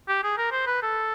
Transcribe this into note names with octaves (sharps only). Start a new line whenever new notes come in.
G4
G#4
A#4
C5
B4
A4